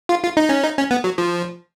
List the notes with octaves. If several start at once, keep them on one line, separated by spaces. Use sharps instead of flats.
F4
F4
D#4
C#4
D#4
C#4
B3
F#3
F3